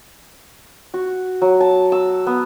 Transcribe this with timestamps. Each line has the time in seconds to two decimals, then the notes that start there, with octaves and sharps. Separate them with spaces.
0.94 F#4
1.42 F#3
1.61 A5
1.92 E6
2.27 B3